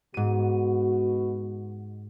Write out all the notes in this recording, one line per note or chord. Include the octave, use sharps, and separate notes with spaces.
G#2 B2 F#4 D#7